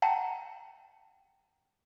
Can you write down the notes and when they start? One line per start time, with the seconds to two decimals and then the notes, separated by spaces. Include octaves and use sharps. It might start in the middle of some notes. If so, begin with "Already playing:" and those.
0.02 F#5 G5 A5 A#5